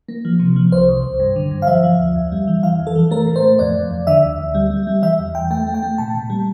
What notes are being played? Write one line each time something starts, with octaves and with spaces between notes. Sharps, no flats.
A#3
F3
C3
F3
C2 C5
C2
C2
G2
D3
G2
F5
F3 E5
F3
D2
F2
G3
E3
E3 F5
F2
A4
E3
A3 A#4
A2
C5
A3
F2 D5
F2
F2
D3 E5
D2
D2
G3
G3
G3
E3 E5
E2
E2 G5
A3 G5
A3
G5
A3
A#2 A5
A#2
G3